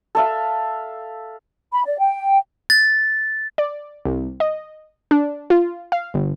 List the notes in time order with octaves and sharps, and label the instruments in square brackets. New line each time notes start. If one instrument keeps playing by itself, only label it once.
[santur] A4 E5 F5
[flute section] B5
D5
G5
[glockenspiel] A6
[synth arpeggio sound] D5
C2
D#5
D4
F4
F5
G1